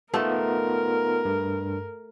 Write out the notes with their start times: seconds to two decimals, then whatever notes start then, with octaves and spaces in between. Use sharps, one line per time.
0.14 A3 B3 D#4 F4 A#4
1.25 G2